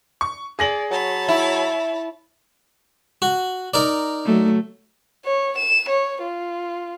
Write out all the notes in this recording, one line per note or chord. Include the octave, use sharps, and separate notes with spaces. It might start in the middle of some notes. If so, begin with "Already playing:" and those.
C#6
G#4 D5 A#6 F#7
F#3 C#5 A5 B5
E4
F#4
D#4 A#4 D5
F#3 A3
C#5
E7
C#5
F4